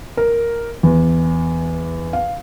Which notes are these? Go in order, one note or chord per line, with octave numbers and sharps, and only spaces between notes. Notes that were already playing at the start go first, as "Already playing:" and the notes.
A#4
E2
F5